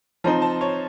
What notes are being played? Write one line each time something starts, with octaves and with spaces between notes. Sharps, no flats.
F3 C4 D#4 A#5
A5
C#5